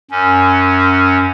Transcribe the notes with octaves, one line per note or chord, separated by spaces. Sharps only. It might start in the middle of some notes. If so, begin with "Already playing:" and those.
F#2 C#4